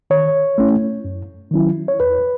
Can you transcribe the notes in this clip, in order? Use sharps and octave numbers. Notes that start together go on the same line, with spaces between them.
D#3 C#5
A3 C#4 E4
F#2
D#3 F#3 C#4 E4
C#5
E2 B4